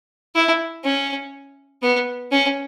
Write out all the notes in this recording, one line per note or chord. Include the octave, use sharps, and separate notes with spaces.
E4
C#4
B3
C#4